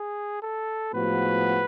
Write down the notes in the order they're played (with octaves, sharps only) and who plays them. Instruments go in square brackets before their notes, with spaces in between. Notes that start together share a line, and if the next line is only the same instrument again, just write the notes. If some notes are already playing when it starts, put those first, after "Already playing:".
Already playing: [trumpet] G#4
A4
[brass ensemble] A2 F3 G#3 B3 F#4 [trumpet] B4